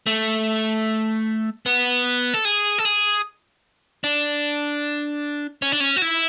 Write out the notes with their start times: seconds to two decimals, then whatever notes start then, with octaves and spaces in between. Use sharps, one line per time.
0.06 A3
1.66 B3
2.34 A4
2.45 G#4
2.79 A4
2.85 G#4
4.04 D4
5.62 C#4
5.72 D4
5.80 C#4
5.96 F#4
6.02 E4